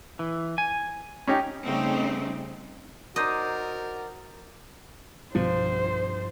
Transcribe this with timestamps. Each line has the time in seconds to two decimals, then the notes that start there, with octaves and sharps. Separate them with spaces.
0.19 E3
0.58 G#5
1.27 C#4 D#4 G4
1.65 C#3 G3 A3 C4 C#4 D#4
3.16 D#4 F#4 A#4 C5 D5 D#5
5.35 B1 G2 F3 C5